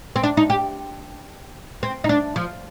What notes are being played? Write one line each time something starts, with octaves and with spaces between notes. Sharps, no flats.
C4
D4
D#4
G4
C4
D#4
D4
F3